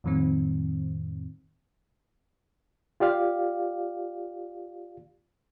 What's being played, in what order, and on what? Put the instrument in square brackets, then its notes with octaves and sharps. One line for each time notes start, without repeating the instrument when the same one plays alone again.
[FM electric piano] F2 A2 D#3 G3 C4
[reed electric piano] F4 G4 D5 F5